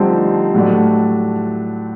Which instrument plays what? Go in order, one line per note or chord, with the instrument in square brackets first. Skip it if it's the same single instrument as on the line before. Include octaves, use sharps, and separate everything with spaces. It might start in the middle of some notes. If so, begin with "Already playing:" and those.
Already playing: [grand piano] D3 F3 A3 C4 D#4 [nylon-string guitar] G3
[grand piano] A2 F#3 A3 D4